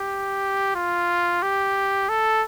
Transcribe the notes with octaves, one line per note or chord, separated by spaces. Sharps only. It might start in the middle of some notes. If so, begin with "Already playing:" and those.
Already playing: G4
F4
G4
A4